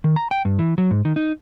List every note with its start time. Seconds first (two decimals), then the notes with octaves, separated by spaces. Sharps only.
0.04 D#3
0.16 A#5
0.31 G5
0.45 G2
0.59 E3
0.78 F#3
0.91 G#2
1.05 D#3
1.16 D#4